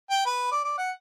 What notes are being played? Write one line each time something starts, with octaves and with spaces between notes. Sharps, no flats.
G5
B4
D5
D5
F#5